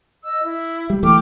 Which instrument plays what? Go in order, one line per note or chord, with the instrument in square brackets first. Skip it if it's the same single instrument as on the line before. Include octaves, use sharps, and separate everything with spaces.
[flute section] D#5 E6
E4
[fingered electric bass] G3
[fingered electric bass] D1 E3 A3 [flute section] G5 D6 F6